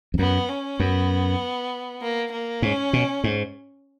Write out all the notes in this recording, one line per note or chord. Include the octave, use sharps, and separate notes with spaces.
F2
F#2 B3
C#4
F#2 B3
A#3
A#3
G#2 C#4
B2
G#2